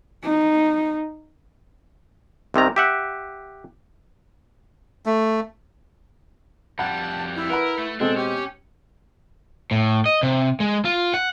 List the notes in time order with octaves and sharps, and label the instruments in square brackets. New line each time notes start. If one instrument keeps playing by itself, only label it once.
[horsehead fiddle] D#4
[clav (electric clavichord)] C2 C3 D#3 A#5
G4 E5 F#5
[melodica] A3
[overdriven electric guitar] F2 G3 [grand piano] F#5 B5 [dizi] A5
[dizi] E4
[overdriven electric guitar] A#4 [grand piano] B4 F#5 B5
[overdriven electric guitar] A3
[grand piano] B2 G#3 C4 [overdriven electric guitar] D4 [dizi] A4
[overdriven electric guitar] C#4 [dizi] G4
[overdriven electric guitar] A2
D#5
C3
G#3
F4
F#5